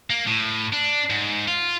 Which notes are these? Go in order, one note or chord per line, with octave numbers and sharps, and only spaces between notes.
A#3
A2
D4
G#2
F4